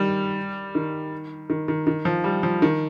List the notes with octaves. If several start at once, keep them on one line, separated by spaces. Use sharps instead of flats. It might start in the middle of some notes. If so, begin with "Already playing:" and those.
Already playing: D#3 G3
D#3
D#3
D#3
D#3
F3
G3
F3
D#3